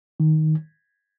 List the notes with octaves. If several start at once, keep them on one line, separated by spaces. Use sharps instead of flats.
D#3